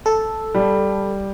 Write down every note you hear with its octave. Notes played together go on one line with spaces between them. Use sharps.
A4
G3